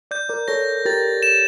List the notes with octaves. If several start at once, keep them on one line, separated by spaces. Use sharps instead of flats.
D5 G6
A#4 D5
A4 C#5 A#6
G4 A#4 A6
E7